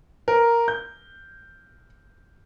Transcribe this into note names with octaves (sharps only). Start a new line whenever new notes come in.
A#4
G6